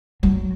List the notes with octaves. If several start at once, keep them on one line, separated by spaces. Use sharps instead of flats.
F#3